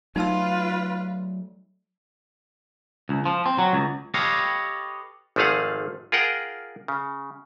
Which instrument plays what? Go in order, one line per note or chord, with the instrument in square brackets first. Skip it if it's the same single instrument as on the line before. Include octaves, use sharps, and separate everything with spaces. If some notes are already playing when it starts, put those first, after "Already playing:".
[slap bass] F#3 A3 [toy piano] D#4 A5 E6 [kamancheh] F4 B4
[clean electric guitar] C#2
F3
C4
F#3
C#2
G4 A4 B4 C#5 D#5 F5
[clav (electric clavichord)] G#1 F3 A3 G#4 F5 F#5
F4 G#4 A#4 F#5 G5
C#3